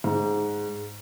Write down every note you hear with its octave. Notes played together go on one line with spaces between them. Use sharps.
G#2